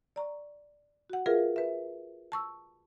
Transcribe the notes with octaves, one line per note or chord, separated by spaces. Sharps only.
D5 A#5 C#6
F#4 F#5
F4 G#4 A#4 B4 E5 F5
B4 E5
A5 C#6 E6